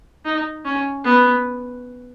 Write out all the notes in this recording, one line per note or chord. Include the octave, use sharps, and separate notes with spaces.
D#4
C#4
B3